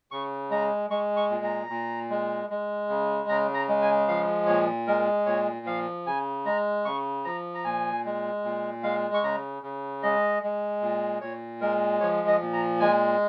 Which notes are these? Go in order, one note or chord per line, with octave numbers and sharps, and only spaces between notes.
C#3 C#6
G#3 A#5
G#3 C#6
C#6
A#2
A#5
A#2
G#3
G#3
C#3
C#3 A#5
A#5
G#3
G#5
F3 F5
A#2 C#5
G#3 A#4
A#2 C#5
F3 F5
C#3 G#5
G#3 A#5
C#3 C#6
F3 A#5
A#5
A#2 G#5
G#3
A#2
G#3 F5
C#6
C#3 A#5
C#3
G#3 D#5
G#3
A#2
A#2 C#5
G#3 A#4
F3 C#5
D#5
A#2
A#5
G#3 G#5